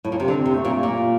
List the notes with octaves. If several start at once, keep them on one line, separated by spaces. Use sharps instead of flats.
A2
A#2
C3
D3 C4
C3
A3
A#2
A3
A#2 A#3